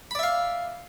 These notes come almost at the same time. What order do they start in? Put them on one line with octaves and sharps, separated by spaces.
B5 D5 E5 F5